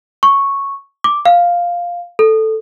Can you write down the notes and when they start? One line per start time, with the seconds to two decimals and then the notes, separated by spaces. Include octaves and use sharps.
0.23 C#6
1.04 D6
1.26 F5
2.19 A4